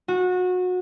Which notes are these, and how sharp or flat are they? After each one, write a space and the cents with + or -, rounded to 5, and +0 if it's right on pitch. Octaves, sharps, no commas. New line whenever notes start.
F#4 -25